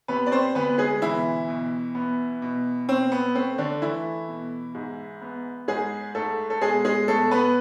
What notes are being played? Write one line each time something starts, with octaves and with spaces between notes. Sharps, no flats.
C3 B3 B4
D5
C4 C5
D2 B3 B4
G#3 G#4
B2 E3 E4
B2
B3
B2
B2 C4
B3
A3 C4
D3 D4
E3 A3 E4
B2
G#2
B3
G#2 G#3 G#4
G#2 A3 A4
A4
B2 G#3 G#4
G#3 G#4
B2 A3 A4
B3 B4